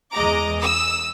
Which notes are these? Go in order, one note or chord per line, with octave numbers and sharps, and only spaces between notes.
E2 G#3 D#5 A#5 D6
D#6 E6